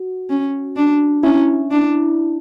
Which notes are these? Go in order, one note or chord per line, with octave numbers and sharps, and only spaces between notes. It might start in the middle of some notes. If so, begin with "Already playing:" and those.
Already playing: F#4
C#4
D4
C#4 E4
D4